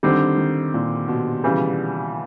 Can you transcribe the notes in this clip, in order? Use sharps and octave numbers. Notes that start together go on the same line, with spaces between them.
D3 D#3 G3 C4
D#3
A#2
B2
C#3 E3 G3